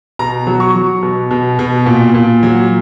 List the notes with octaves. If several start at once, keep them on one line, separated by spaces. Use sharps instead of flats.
B2 A#5
F#3
C#6
F#3
B2
B2
B2
A#2
A#2
F#3